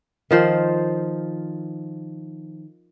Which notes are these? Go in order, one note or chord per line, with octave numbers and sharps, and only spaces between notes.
D#3 F3 C5